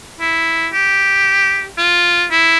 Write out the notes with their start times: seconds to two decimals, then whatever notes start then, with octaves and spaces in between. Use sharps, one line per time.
0.21 E4
0.73 G4
1.78 F4
2.31 E4